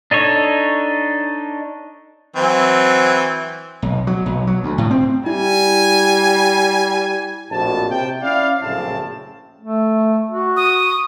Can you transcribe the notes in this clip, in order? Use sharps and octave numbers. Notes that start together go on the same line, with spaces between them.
D4 D#4 A4 C#5
E3 F#3 C4
B1
F#3
B1
F#3
D2
A2
C4
G3 E4 G#5
A#1 F2 A2 F#4 A5
C3 G5
C#4 E4 D5 F5
A#1 F#2 A2 C#3 C4 A5
A3
F#4
D#6